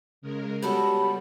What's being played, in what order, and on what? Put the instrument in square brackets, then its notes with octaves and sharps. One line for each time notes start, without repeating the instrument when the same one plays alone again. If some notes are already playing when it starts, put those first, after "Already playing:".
[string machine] C#3 G#3 A#4
[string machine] G3 [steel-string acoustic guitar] B3 F#4 A4 [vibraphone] G4 C#5 [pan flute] B5